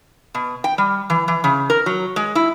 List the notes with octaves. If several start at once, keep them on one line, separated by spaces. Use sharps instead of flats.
B2
G5
G3
E3
E3
C#3
A#4
F#3
G#3
E4